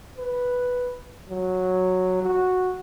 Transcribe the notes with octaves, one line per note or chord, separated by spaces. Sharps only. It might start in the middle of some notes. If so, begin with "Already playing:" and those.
B4
F#3
F#4